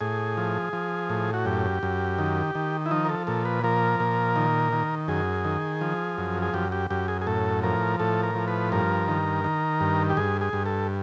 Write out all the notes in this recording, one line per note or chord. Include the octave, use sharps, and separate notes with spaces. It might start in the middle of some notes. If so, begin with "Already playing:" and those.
A2 G#4
F3
F3
A2
F#4
F#2 G4
F#2
D#3
D#3
E4
F3 D#4
A#4
A4
A#2 A4
B4
F3 A#4
A#2
D#3
D#3
F#2 G#4
D#3
F3
F#2
G#4
F#2 G4
G4
F#2 G4
G#4
G#4
A2 A4
F3 A#4
A2 A4
A#4
F3
B4
G2 A#4
D#3
D#3
G2
G4
G2 G#4
G#4
G2
A4